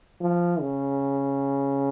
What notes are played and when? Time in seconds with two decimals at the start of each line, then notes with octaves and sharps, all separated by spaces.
0.20 F3
0.60 C#3